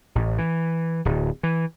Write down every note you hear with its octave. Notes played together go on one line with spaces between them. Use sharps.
A1
E3
D1
E3